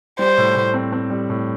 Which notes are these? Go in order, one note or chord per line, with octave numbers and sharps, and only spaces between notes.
G3 C5
A2
A2
C4
C4
G3
A2